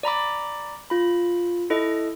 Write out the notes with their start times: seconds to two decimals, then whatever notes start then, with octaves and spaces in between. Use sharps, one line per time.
0.03 D5 A#5 B5 D6
0.90 F4 B5
1.70 E4 A4 D#5